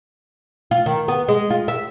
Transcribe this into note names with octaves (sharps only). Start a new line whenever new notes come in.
F4
D#3
B3
G#3
F4
E5